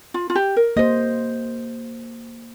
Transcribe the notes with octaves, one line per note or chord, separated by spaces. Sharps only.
F4
F4
G4
A#4
A#3 G4 C5 D#5